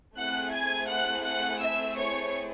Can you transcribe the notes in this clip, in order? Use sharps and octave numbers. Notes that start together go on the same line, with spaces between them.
A3 C4 E4 G#4 F#5 F#6
G#5 G#6
F#5 F#6
F#5 F#6
E5 E6
C#5 C#6